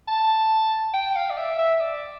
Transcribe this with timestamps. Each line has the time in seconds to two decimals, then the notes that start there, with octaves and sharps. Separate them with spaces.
0.08 A5
0.94 G5
1.16 F5
1.30 D5
1.37 E5
1.59 E5
1.81 D5